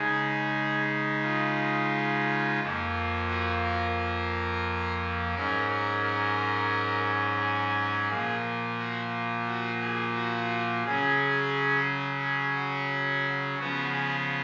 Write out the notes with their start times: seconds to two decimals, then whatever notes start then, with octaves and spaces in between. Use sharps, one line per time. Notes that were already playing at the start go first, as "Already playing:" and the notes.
Already playing: C#3 G#3 D#4 G#4
1.22 F4
2.60 F2 F3 A#3
3.28 F#4
3.63 A#4
3.97 A#4
5.35 G#2 F#3 C#4 A#4
5.69 A#4
6.03 A#4
7.40 G#4
8.09 A#2 F3 A#3
8.78 F#4
9.47 F#4
9.81 G#4
10.15 F#4
10.84 C#3 F#3 C#4 G#4
12.22 G#4
12.55 F#4
13.58 C#3 F3 B3 F#4
13.92 G#4